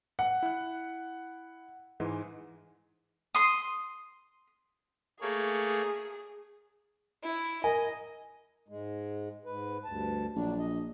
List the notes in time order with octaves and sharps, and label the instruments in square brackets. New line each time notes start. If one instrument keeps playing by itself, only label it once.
[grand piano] F#5
[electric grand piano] E4 F#6
G#2 E3 G#3
[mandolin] C6 D#6
[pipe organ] A3 A#3 C#5 [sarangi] G#4
[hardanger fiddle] E4
[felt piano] A#4 G#5 [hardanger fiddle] D#5
[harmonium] G#2 G#3
G#2 B4
D2 G2 A5
[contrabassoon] A#1 [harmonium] F#3 D4
[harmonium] D#5